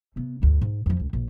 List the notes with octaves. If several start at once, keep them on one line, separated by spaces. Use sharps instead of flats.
C3 B3
D2 G2
G#2
F2 F3
C#2
A#1